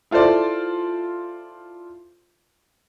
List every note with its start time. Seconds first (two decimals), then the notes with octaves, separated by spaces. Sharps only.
0.11 E4 F4 A4 C5 D5